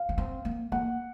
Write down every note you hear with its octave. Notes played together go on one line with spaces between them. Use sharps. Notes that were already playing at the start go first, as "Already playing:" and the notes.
Already playing: F5
C#4
C4
A#3
A#3 F#5